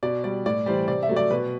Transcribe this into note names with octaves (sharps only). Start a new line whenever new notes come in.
B2 D5
G3 D5
A2 D5
E3 G3 C5
C3 D5
E5
F#3 A3
D5
B2 B4